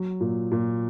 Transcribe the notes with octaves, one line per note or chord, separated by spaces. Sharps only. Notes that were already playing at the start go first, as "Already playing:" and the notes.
Already playing: F#3
A#2
A#2